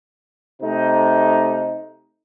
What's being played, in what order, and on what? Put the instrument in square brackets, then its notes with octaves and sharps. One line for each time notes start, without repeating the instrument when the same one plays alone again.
[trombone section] C3 A3 D#4